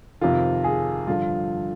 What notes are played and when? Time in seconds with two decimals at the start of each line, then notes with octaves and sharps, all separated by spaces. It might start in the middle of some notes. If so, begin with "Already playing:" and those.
0.21 F2 C3 D#3 F4
0.64 G#4
1.07 G2 D3 F3 F4